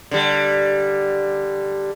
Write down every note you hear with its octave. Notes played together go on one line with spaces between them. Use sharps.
D3 G3